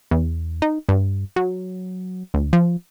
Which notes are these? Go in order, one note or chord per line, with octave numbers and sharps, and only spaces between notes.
E2
D#4
G2
F#3
D2
F3